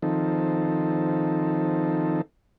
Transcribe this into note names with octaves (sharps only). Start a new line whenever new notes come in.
D#3 F3 C4 D#4 A4